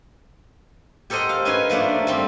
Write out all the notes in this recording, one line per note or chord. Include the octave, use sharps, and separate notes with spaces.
G4 A4 A#4 C5 D#5 F#5
F5
C#4 D#4 B4 F5 G#5
F3 A3 A#3 D4
G3 A#3 C4